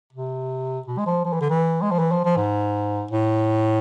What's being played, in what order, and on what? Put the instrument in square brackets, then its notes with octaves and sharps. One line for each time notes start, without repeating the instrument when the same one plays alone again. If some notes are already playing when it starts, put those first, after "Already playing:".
[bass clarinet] C3
B2
G#3
F3
F3
E3
D3
E3
G#3
F3
E3
F3
F3
G#2
A2